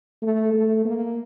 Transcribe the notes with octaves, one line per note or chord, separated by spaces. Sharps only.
A3
A3
A#3